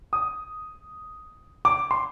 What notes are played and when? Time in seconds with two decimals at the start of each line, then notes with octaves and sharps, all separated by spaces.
0.13 D#6
1.65 D6
1.91 C6